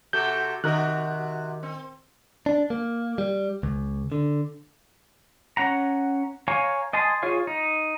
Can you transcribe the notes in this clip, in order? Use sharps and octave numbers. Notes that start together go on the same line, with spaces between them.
C3 F#4 A4 G6
C3 D#3 F#4 A#4 D#5 F#6
C4
D4
A#3
G3
C#2
D3
C#4 F#5 A#5
C#5 F5 G#5 A#5 C#6
D#5 G#5 A5 C6 D#6
F4 G#4 C#5 F5
D#4